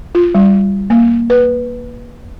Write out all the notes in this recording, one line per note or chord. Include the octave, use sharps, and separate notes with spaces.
F4
G3
A#3
B4